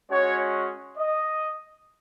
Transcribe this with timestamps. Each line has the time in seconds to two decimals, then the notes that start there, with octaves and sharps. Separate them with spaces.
0.11 G#3 C#4 F#4 C#5
0.97 D#5